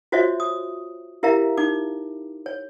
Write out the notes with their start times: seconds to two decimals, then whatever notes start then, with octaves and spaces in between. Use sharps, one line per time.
0.12 F4 F#4 C5 C#5 D#5 E5
0.40 D#6
1.23 E4 G4 A#4 E5 F5 A#5
1.57 D#4 D6
2.46 C#5